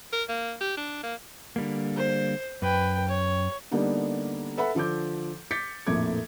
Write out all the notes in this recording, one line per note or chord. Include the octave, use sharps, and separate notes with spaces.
A#4
A#3
G4
D4
A#3
D3 G3 A#3
C5
F#2 B4 G5
C#5
D3 G3 A#3 B3 D4 D#4
A4 B4 E5 F#5 B5
D3 F3 A4 D6 G6
D6 G6 A6 B6 C#7
A#1 F2 A2 A#3 D6 G#6